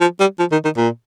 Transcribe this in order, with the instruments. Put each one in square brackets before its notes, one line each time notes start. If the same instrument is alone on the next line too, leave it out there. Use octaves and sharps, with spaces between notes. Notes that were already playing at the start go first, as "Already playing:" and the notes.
[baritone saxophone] F3
G3
F3
D#3
D#3
A#2